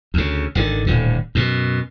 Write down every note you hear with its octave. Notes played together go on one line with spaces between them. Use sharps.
D2 C#3
G#1 D3 D#3
D#1 A2 D3
F#2 B2